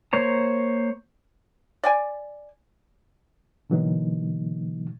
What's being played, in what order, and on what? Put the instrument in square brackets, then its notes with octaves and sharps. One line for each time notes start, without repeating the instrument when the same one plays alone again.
[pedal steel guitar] A#3 C5 C#5 A#5
[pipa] D5 G5 G#5
[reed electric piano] B2 D3 E3 F#3 A#3 D#4